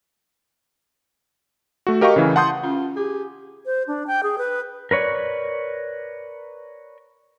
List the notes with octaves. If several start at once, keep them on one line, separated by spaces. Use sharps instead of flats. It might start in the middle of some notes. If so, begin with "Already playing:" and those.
A3 F#4
G4 A#4 D#5 F5 G5 C#6
C#3 E3
F#5 A5 C6 D#6 G6
C#4 F4
G4 G#4
C5
D4
G5
G#4
B4
A#4 B4 C#5 D5